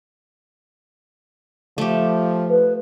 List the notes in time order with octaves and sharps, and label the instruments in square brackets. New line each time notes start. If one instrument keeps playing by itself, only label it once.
[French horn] F3 [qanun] A3 G4
[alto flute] B4